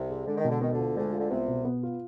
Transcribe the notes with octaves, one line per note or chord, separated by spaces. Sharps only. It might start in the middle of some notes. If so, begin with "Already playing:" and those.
Already playing: C2 C3
G#4
D3 G#3
D#3
B2 D3
D#3 B3
D2 D3
F4
D2 D3 G#3
F4
D3
C2 C3 B3
B2
B3
F4